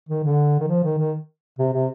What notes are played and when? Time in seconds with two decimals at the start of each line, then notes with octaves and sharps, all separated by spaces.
0.09 D#3
0.24 D3
0.60 D#3
0.68 F3
0.84 D#3
0.98 D#3
1.59 C3
1.73 C3